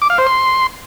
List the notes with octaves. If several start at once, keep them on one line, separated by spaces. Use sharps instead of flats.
D6
F5
C5
C6